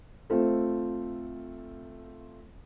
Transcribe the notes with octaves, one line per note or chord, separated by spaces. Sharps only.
A3 C4 F4 A4